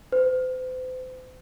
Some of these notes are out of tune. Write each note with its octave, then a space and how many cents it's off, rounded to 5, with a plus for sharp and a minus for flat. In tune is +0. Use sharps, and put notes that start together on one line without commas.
C5 -40